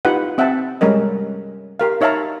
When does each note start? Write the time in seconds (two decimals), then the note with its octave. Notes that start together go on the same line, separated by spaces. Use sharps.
0.05 D#4 F4 G4 B4 F#5
0.38 C4 E5 F#5 G5 A5
0.81 G3 G#3 C#4 A#4 D#5
1.80 G4 A#4 F5
2.01 D#4 C#5 E5 F5 A5 A#5